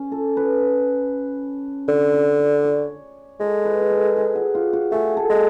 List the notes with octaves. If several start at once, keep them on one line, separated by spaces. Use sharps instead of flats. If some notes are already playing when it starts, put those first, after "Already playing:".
Already playing: C#4
A4
B4
D3 C#5
D5
D5
C#5
G#3 A4
B4
G#4
A4
G#4
F#4
F4
F#4
A3 G#4
A4
G#3